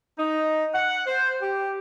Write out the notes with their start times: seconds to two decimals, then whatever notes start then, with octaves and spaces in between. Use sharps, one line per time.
0.18 D#4
0.74 F#5
1.07 C5
1.42 G4